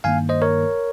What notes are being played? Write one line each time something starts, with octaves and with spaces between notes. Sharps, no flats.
G2 D#3 A#3 F5 G#5
C5 D#5
A#4 C#5